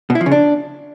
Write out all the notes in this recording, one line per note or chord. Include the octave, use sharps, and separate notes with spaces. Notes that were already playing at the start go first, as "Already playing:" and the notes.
B2
E4
F3
C#3
D4